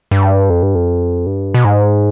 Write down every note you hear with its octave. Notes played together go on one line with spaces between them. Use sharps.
G2
F2
G2
F2
G2
B2
G#2